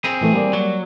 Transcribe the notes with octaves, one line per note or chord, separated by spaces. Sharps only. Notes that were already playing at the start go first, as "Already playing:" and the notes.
C4 G#4
A2 E3 A3
G3 A#3 D5
F#3